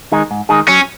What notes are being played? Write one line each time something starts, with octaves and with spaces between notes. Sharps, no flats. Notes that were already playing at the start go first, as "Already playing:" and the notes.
D#3 G#3 D#4 G#4
G#2
D#3 G#3 D#4 G#4
F#3 C#4